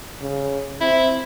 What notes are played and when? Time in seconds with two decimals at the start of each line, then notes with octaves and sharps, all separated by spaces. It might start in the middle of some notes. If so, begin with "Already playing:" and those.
0.21 C#3
0.81 C4 E4